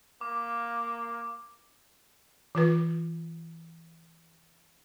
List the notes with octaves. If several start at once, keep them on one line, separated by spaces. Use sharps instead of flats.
A#3 D6
E3 F4 B4